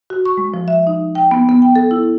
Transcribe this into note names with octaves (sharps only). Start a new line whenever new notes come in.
F#4
C#6
G#3
F3
E5
D#4
G5
B3
B3
G5
A4
E4